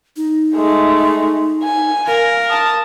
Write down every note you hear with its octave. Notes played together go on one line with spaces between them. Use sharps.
D#4
G#3 A3
G#5
A#4 F5
A5 D#6